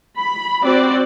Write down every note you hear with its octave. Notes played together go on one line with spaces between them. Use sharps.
B5
C4 F#4 D5